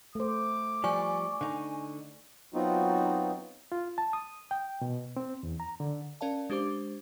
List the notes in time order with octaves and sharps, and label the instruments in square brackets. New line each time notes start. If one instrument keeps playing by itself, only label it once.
[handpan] A3 C5 [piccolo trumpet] D6
[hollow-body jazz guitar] F3 G3 [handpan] D5 [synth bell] G#5 C#6
[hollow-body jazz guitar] D3 D#4
[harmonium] F#3 B3 C4 D#4 F4 F#4
[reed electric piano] F4
A5
D#6
G5
B2
C4
E2
A#5
D3
[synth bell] C#4 A#4 D5 F5 A5
G#3 D4 G4 C5 D6